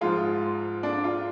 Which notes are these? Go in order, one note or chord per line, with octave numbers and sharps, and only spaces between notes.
G#2 F3 G#3 F4
D4
F4